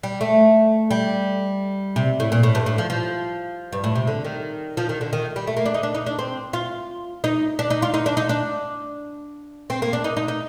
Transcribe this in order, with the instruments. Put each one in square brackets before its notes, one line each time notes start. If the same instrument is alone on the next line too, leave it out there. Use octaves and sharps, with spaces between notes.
[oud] G3
A3
G3
C3
A2
A#2
A2
G2
A2
F3
F3
G2
A2
C3
D3
D#3
F3
D#3
D3
D#3
G3
A3
A#3
D4
D#4
D4
D#4
D4
C4
F4
D#4
D4
D#4
F4
D#4
D4
D#4
D4
C4
A#3
D4
D#4
D#4
D#4